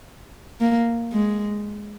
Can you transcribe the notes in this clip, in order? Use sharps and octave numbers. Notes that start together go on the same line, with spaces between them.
A#3
G#3